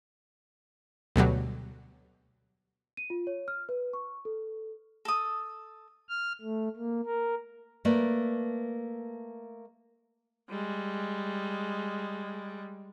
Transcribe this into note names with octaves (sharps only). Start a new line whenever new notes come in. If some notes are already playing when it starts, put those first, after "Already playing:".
D2 B2 F#3 G3
D#7
F4
C#5
F6
B4
C#6
A4
A4 D#6
F6
A3
A#3
A#4
A3 A#3 B4 D5
G3 G#3